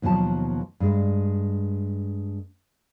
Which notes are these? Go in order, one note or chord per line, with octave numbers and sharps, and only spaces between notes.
D#2 B2 F3 F#3 A5
G2 G#3